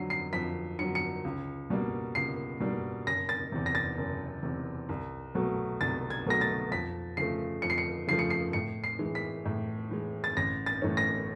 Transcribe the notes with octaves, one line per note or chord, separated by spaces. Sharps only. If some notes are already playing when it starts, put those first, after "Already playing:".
Already playing: F2 D3 F#3 C7
C7
F2 B6
D3 F#3 C#7
C#7
C#2
B2 G3 A#3 D4
C#2 C7
B2 G3 A#3 D4
F#1 A#6
A6
E2 C3
A#6
A6
F#1
E2 C3
C2
B2 F#3 A3
C2 A6
G#6
B2 F#3 A3 A#6
A6
F2 B6
C#3 F3 A3 C7
F2 C#7
C7
C#7
C#3 F3 A3 C7
C#7
C7
A2 C#7
C7
E3 G#3
B6
A2
E3 G#3
A6
A1 A#6
A6
A2 E3 A3 C#4
A#6